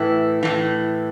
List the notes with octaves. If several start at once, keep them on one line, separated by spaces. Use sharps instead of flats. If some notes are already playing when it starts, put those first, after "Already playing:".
Already playing: A2 E3 E4
A2 E3